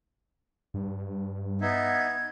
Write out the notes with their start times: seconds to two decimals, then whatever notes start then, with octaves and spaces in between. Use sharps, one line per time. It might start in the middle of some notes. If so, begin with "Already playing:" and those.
0.74 G2
1.61 B3 D#4 E5 G#6